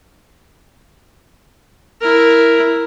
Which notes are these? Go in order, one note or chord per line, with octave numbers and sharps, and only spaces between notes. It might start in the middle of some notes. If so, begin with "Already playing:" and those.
E4 A#4